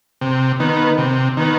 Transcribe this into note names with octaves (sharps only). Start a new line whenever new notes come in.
C3
D#3 B3
C3
D#3 B3